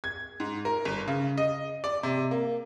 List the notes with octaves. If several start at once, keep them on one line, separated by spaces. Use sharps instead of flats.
G#6
G#2
A#4
G1
C#3
D#5
D5
C3
A#3